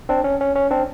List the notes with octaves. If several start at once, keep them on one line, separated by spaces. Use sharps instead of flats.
C4 D4
C#4
C#4
C#4
C4 D4